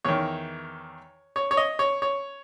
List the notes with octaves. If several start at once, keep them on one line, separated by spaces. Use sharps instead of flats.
E2 D#3 C#5
C#5
C#5
D#5
C#5
C#5